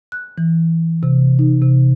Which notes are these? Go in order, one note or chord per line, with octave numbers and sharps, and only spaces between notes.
F#6
E3
C3
D#4
C3